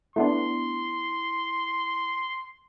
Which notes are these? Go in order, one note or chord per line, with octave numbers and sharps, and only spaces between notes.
A3 B3 D4 E4 C6